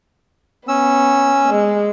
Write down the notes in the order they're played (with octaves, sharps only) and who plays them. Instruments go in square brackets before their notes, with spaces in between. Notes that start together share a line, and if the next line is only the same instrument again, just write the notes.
[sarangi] B3 [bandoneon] C#4 E6
[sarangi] G#3